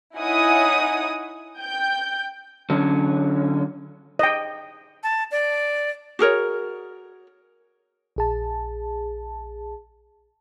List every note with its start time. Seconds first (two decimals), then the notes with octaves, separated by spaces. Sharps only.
0.16 D#4 E4 C#5 F#5 G#5 D#6
1.58 G5 G6
2.70 D3 F#3 C#4
4.19 D#5 G5
5.03 A5
5.31 D5
6.19 F#4 G#4 A#4 C#5
8.16 A#1 G#4 A5